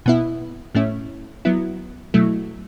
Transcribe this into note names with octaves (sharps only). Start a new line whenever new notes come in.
B2 B3 E4
A2 A3 C#4 E4
F#3 B3 E4
B2 F#3 A3 E4